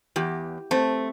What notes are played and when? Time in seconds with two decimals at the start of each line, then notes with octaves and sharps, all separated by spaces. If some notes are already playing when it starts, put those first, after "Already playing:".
0.16 E2 G4
0.71 A3 C4